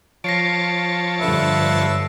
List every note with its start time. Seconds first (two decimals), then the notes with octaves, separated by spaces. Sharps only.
0.24 F3 C#5 A5 A#6 C7 D7
1.20 G2 D3 B4 E5